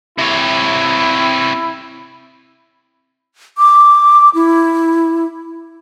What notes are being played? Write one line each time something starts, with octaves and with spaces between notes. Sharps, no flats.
C3 E4 C#5
D6
E4